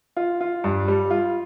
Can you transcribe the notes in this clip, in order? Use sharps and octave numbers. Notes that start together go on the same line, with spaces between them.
F4
F4
G2
G3
F4